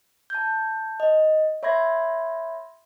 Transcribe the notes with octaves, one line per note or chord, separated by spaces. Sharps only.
A5 G6
D#5
C#5 E5 B5 C6 G#6 A#6